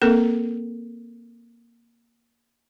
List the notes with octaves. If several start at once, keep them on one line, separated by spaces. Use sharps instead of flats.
A#3 C4 A4 A#4